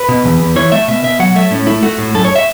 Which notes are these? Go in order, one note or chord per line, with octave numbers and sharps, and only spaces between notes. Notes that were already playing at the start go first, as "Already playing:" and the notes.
Already playing: B4
B2
E2
E2
E3 C#5
A3 E5
B2 E5
B2 E5
F#3 F#5
A3 E5
A2 C#4
A3 E4
A3 F#4
A2
F#2 A4
C#5
E5